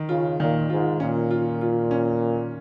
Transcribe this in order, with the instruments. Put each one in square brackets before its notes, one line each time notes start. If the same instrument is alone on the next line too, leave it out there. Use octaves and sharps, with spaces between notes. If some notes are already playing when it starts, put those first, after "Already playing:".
Already playing: [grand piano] D#3
[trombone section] C#3 [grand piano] F4
[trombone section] A#2 [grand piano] D#3
[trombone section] G#2 [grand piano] F4
[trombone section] A#2 [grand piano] C#4
[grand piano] F4
F4
C#4